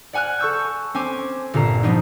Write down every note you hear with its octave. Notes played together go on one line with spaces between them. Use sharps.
D5 F#5 G#5 F6 F#6
A4 C#6 E6 G6
C4 C#4 G#5 D6
G1 A#2 A4 A#5 C7
F3 G3 B3 D4 D#4